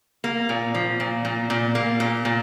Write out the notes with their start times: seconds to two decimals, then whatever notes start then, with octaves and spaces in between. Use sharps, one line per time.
0.24 A#3
0.49 A#2
0.74 F3
1.00 A#2
1.25 A#2
1.50 A#2
1.75 A#3
2.00 A#2
2.25 A#2